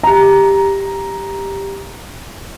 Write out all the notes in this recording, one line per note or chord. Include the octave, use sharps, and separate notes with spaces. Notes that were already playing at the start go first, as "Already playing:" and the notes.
G4 A#5